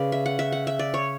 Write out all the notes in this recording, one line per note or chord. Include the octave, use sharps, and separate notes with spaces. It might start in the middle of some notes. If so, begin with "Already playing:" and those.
Already playing: C#3 B4 D5
E5
F#5
E5
F#5
E5
D5
C#5